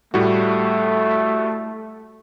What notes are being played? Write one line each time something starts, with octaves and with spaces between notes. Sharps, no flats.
A2 G3 A3 F#4